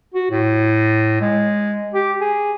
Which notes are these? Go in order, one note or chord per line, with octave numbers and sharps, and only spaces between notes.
F#4
A2
G#3
G4
G#4